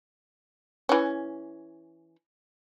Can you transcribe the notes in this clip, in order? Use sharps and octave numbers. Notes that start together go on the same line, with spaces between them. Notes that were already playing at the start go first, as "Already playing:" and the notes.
E3 C#4